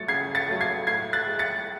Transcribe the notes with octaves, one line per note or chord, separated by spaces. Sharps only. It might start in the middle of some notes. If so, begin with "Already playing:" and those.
Already playing: F#3 A3 A6 C#7
C#3 G#6 C7
A6 C#7
F#3 A3
G#6 C7
A2 G#6 C7
F#6 A6
G#3
A6 C#7